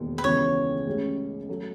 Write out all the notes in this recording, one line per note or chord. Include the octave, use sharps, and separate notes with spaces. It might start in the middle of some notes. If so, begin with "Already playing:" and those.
Already playing: E1 D#2 D#3
B4
C#2 C#3 E3 B3 C#5
A1 A2 G#3 C#4
F#3 A3